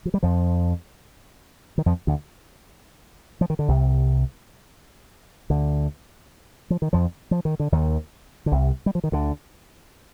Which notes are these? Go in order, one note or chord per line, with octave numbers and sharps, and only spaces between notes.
F3
G3
F2 F3
D#3
F2 F3
D2 D3
F3
D#3
D3
C2 C3
D2 D3
F3
D#3
F2 F3
F3
D#3
D3
D#2 D#3
D3
C2 C3
G3
F3
D#3
D2 D3